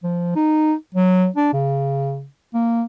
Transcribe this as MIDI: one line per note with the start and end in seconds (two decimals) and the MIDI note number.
0.03 0.33 53
0.36 0.74 63
0.95 1.28 54
1.36 1.51 62
1.54 2.26 49
2.54 2.83 58